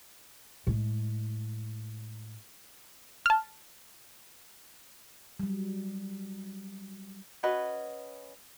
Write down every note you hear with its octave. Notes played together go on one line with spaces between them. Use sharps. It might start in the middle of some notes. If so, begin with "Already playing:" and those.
A2 G#3
A5 F6
F#3 G3
C#4 F#4 B4 D#5